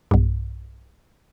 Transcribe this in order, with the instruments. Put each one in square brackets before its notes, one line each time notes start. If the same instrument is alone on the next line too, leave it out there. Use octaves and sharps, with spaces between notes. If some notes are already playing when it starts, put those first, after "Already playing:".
[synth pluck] B1 G2